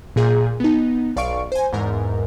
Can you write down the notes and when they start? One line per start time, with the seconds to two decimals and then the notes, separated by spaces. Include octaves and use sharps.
0.16 A#2 G#4 G6
0.60 B3 D#4
1.16 B1 D5 F5 C#6 D7
1.52 C5 G#5
1.73 E2 G#2 A#4